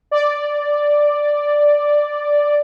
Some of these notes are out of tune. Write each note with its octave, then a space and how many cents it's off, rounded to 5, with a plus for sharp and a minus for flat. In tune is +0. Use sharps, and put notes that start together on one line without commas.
D5 +0